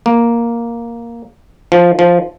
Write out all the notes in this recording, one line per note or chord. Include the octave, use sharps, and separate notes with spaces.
A#3
F3
F3